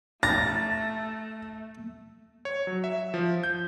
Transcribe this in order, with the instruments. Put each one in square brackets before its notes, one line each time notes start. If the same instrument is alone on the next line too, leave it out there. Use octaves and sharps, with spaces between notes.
[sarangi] A3 [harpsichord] A#5 [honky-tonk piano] A6
[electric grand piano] C#5
F#3
E5
F3
G6